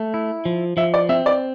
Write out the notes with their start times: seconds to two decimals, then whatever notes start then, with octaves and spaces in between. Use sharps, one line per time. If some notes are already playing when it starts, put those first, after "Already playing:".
Already playing: A3
0.14 E4
0.45 F3
0.77 F3 E5
0.94 D5
1.09 C4 E5
1.26 D5